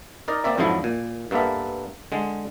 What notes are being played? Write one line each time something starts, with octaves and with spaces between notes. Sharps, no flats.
D#4 A#4 D5
A#3 C4 D5 E5
F2 G#2 D3 F3 F#3 E4
A#2
G2 A#3 B3 A4 E5
D3 G#3